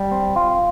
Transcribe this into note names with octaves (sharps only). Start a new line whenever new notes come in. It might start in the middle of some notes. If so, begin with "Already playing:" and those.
Already playing: G3
C4
F4